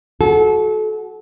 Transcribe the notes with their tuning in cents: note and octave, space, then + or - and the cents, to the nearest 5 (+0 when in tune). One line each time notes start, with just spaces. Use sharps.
F#4 +0 A4 -30